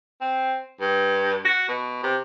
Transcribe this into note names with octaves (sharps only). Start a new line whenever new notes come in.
C4
G2
F#4
B2
C3